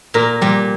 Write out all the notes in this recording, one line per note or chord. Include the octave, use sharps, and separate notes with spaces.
A#2 A#4
A#2 G3